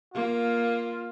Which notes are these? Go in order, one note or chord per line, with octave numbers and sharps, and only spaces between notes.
A#3 F4